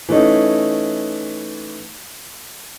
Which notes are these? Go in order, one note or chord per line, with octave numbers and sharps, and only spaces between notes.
E3 A3 C#4 D#4